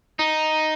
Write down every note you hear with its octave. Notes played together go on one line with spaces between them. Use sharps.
D#4